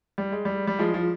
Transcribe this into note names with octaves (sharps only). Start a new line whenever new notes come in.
G3
G#3
G3
G3
F3 G#3
F3